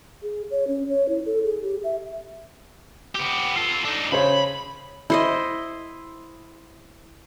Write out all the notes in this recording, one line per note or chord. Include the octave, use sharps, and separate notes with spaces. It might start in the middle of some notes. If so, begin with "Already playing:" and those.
G#4
C#5
C#4
C#5
E4
A4
G#4
G4
E5
B3 G4
F4 A4
D4 D#4
C#3 C5 C#5 B5
E4 C5 D#5